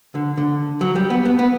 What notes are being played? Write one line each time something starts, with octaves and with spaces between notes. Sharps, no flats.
D3
D3
F#3
G3
B3
B3
B3